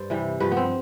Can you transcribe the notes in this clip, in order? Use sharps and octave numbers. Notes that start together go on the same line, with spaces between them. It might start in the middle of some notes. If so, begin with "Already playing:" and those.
Already playing: G2 C5 D5
C3 E3 G3
G2 F3 B4
B3
C4